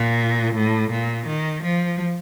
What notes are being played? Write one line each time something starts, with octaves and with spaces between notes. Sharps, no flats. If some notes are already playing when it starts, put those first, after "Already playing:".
Already playing: A#2
A2
A#2
D#3
F3